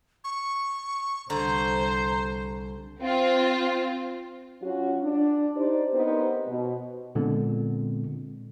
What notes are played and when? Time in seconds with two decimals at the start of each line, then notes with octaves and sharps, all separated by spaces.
0.24 C#6
1.30 C2 D3 C5 A#5
3.00 C4 F4
4.62 F#3 C#4 F4 F#4
5.03 D4
5.56 D#4 G4 C5 D5
5.94 B3 C4 D#4 G4 A#4 C5
6.48 B2
7.15 A#2 D3 G#3 B3 C4